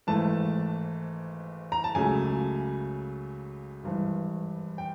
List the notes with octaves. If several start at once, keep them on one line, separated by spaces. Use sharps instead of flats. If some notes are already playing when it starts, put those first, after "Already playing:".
G#1 G#2 E3 A3 A5
A#5
A5
C#2 C#3 F#3 A3 G#5
G#1 G2 E3
G5